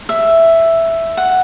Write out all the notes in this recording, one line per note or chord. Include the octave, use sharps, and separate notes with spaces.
E5
F#5